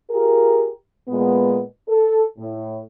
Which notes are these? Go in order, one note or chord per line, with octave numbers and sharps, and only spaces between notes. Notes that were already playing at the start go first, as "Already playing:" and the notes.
F4 G4 G#4 A#4
A#2 G#3 B3
A4
A2